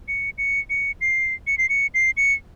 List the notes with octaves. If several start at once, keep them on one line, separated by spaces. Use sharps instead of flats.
C#7
C#7
C#7
C7
C#7
C7
C#7
C7
C#7